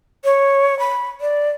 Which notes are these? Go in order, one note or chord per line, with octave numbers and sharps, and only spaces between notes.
C#5
B5
D5